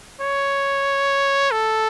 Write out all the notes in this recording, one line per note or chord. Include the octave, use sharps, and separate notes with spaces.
C#5
A4